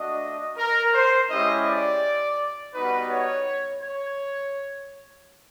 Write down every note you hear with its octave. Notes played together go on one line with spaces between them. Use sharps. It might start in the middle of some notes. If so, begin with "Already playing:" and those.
Already playing: A3 D4 F#4 D#5
A#4
C5
G#3 C#4 E4 G4 D#5
D5
G3 B3 D#4 F#4 B4
C#5
C#5